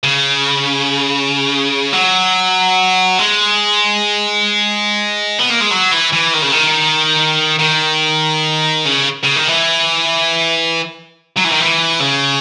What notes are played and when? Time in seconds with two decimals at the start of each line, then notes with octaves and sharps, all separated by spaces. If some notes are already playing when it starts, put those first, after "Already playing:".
0.04 C#3
1.93 F#3
3.19 G#3
5.39 B3
5.50 A#3
5.61 G#3
5.71 F#3
5.91 E3
6.13 E3
6.33 D#3
6.42 C#3
6.52 D#3
7.59 D#3
8.85 C#3
9.24 C#3
9.36 D#3
9.48 E3
11.37 F#3
11.45 E3
11.52 D#3
11.60 E3
12.00 C#3